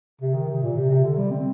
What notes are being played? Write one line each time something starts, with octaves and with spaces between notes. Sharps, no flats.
C3
D#3
C3
A#2
C3
C3
D3
G3
C4